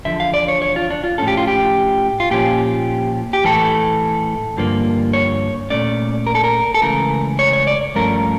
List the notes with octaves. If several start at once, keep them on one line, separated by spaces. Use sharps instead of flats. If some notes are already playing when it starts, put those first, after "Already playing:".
E2 D3 F3 E5
F5
D5
C#5
C#5
F4
D4
F4
A2 F3 C#4 A4
G4
F4
G4
F4
A#2 F3 C#4 G4
G4
A2 E3 A3 A4
G2 D3 F3 A#3
C#5
A#2 A3 C#4 D5
A#4
A4
A#4
A4
C#2 C#3 E3 A3 A#4
C#5
C#5
D5
G2 F3 A3 C#4 A#4